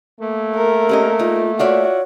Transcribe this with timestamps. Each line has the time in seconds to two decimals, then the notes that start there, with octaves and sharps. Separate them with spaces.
0.20 A3 A#3
0.55 A#4
0.89 C4 C#4 G4 D#5
1.19 D#4 F4
1.59 F4 F#4 C#5 D5 E5